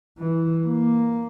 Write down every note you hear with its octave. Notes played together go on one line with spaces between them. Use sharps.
E3
A#3